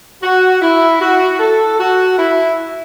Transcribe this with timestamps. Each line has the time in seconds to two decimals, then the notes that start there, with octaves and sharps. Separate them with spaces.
0.22 F#4
0.61 E4
1.01 F#4
1.39 A4
1.79 F#4
2.18 E4